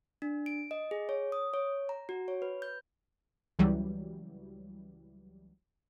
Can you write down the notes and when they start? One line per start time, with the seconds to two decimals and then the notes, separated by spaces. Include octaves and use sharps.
0.22 D4
0.46 D7
0.71 D#5
0.91 G#4
1.09 C#5
1.32 D#6
1.54 C#5
1.89 A#5
2.09 F#4
2.28 C#5
2.42 B4
2.62 G6
3.59 C#2 E3 F#3 G3